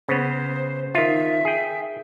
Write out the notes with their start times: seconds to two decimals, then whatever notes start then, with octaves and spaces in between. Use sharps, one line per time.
0.09 C#3 B3 C5
0.95 D#3 F4 E5
1.45 G#4 G5